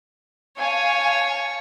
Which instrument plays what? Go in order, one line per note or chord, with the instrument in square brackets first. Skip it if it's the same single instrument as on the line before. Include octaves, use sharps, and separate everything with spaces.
[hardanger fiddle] C#5 [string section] F5 G#5 A5